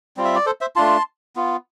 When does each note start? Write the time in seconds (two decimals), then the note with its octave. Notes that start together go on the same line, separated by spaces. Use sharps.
0.17 G3 C4 F4
0.25 E5
0.35 D5
0.46 A4 C5
0.61 C5 E5
0.76 A3 D4 F4 A5 C6
1.36 B3 F4